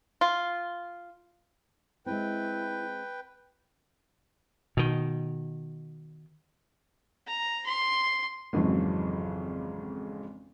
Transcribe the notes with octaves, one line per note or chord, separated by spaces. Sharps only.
F4
G#3 C4 E4 B4 G5
B2 D#3
A#5
C6
G#1 F2 C#3 E3 F#3